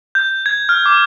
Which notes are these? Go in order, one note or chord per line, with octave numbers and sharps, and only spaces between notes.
G6
G#6
F6
D6